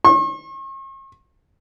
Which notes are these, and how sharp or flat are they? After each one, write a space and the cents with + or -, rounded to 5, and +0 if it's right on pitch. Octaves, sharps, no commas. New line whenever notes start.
C#6 -45